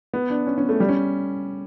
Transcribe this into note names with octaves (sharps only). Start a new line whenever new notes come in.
B3
D4
C#4
C#4
A3
G3
C#4